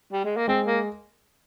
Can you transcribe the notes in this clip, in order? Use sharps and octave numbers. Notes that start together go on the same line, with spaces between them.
G3
G#3
A#3
G#3 C4
A#3